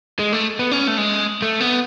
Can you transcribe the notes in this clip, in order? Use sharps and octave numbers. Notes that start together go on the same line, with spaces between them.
G#3
A3
B3
C#4
A3
G#3
A3
B3